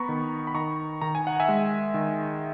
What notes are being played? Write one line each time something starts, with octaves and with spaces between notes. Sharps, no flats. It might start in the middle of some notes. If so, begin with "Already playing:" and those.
Already playing: B3 A#5 B5 C#6
D#3
B5
D#3 A#5 C#6
D#3 A#5
G#5
F#5
E5 G#5
G#3
D#3